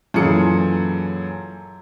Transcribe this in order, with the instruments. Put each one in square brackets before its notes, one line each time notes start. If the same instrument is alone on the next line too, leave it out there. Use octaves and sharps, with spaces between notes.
[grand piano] F#2 A#2 E3 G#4 A4 C#7